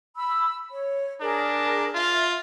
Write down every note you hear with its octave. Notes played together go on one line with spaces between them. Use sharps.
B5 E6
C#5
D4 G#4 A#4
F4 E5